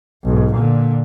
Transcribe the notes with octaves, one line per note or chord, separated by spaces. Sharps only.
B1 G#2
A#2 D3